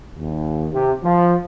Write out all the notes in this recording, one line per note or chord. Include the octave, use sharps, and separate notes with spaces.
D#2
C3
F3